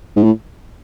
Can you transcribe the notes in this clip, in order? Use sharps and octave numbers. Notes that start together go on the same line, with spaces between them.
G#2
A2